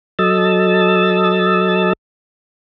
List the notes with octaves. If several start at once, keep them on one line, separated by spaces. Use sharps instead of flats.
F#3 A4 D#5 E6 A6